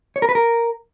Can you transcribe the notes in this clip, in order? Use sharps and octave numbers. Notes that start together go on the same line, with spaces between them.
C#5
A#4
B4
A#4